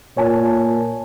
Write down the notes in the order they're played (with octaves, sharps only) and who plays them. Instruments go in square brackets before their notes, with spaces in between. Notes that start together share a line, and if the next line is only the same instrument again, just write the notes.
[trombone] A#2 [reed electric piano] C#5 G#5 A5